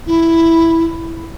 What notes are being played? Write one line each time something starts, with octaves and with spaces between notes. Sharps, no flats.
E4